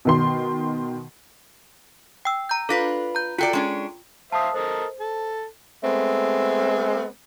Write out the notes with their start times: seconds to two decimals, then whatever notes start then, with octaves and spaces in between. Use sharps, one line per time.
0.05 B2 D#3 C6
2.25 G5 E6
2.49 A#5 G6
2.69 D4 F4 A4 B4 A#6 B6
3.15 A#5 G6
3.38 F4 F#4 A4 D5 G5 C#7
3.53 G#3 C#4 D4
4.32 C5 E5 F5 A5 D#6
4.54 A4 A#4 C5 D#5
5.00 A4
5.83 G#3 A3 B3 C4